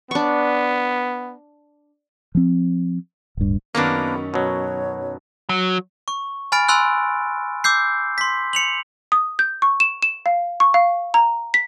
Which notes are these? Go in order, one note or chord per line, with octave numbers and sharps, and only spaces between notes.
B3 D4 C#6
F3 C4
D1 G2
F#2 D#3 A#3 B3 C#4 D4
B2 F#3 C#5
F#3
C#6
G#5 B5 F6 A6 D7
G#5 B5 C6 E6 F#6
D6 E6 G6 C7
C6 B6
C#7 F7 F#7
D#6
G6
C#6
E7
E7
F5
C#6
F5
A#5
B6